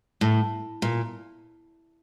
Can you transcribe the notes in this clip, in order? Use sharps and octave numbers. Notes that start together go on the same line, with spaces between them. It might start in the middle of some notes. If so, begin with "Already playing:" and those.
A2
A#2